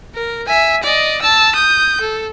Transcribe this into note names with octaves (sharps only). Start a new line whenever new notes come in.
A#4
E5 G#5
D5 D#5
A5 E6
D#6 G6
A4